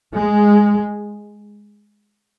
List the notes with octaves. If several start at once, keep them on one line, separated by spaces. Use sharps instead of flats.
G#3